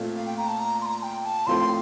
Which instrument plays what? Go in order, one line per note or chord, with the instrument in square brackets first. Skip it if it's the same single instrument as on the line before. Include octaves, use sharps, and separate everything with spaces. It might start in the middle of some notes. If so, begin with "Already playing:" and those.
Already playing: [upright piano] A#2 A3 C4 F4
[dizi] F5
G5
A#5
A5
A#5
C6
A#5
G5
A5
[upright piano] A2 F3 C4 F4 A4 [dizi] C6